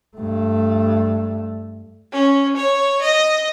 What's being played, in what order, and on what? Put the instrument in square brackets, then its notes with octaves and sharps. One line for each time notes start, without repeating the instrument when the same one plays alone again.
[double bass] G2 A3
[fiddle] C#4
C#5
D#5